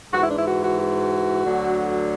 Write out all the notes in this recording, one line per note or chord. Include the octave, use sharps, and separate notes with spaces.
G#2 E3 F#4
E4
D4
E4
F#4
F#4
F#4
D2 D3 F#3